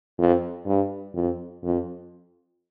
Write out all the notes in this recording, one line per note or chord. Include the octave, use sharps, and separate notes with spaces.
F2
G2
F2
F2